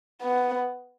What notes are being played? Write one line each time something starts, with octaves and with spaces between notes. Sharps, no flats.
B3